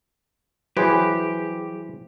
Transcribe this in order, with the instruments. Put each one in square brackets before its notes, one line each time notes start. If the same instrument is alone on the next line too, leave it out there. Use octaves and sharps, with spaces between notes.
[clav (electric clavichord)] E3 B4 C5 [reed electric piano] F#3 G#4 [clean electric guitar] G4